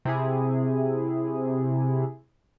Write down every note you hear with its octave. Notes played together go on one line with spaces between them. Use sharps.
C3 E4 G#4